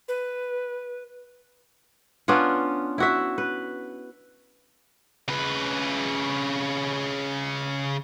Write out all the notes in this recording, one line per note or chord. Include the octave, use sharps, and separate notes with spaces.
B4
B3 C#4 D4 F4
E4 F#4 E5
B4
C#3 B4